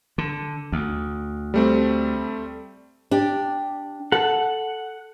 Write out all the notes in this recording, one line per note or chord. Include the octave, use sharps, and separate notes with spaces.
D3
D2
G3 A3 C4
D4 G4
A4 F#5